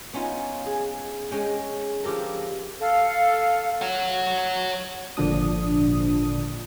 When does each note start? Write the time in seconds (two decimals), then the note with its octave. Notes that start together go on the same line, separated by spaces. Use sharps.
0.13 B3 C#4 D#4 F4
0.66 G#4
1.31 G#3 C#4 G5
2.04 F3 F4 G4 A4 A#4
2.79 A4 F5
3.82 C#5 F#5
5.17 G#1 A#2 D3 F3 D4 D#6